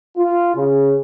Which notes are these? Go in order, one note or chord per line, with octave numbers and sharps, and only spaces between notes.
F4
C#3